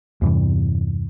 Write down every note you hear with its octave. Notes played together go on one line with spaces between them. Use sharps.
E2 G2 C3 E3